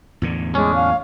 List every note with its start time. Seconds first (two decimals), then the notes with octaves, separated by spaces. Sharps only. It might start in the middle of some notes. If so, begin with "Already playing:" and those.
0.22 E2 A2 D3
0.55 G#3 C#4 D4
0.75 F5